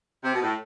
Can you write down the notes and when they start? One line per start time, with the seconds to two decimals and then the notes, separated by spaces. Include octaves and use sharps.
0.23 C3
0.33 B2
0.42 A2